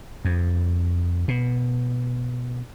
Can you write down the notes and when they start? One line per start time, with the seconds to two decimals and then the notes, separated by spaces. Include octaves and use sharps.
0.25 F2
1.28 B2